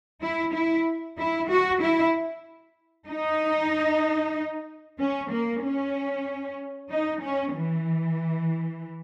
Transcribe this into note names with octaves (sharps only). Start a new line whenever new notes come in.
E4
E4
E4
F#4
E4
D#4
C#4
A#3
C#4
D#4
C#4
E3